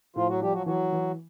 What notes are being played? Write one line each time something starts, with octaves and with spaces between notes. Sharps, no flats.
A2 F3 F4
F#3 F#4
F3 G3 G4
F#3 F#4
E3 F#3 F#4
E3